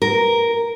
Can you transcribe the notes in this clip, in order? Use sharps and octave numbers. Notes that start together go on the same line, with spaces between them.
A#4